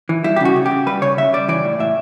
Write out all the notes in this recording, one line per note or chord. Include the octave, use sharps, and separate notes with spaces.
E3
G3 E4
G4
C#3 F#4
C#3
G4
C#3
G3 B4
C#3 C#5
C#3 E5
G3 D5
E3 D5
A2
A2 E5